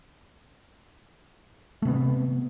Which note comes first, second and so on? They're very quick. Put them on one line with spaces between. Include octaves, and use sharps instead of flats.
A3 C3 B3